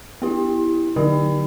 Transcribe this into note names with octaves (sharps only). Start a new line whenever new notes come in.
B3 E4 G4
D3 F#3 B3 D#4 G4